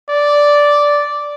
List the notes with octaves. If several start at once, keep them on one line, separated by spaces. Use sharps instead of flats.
D5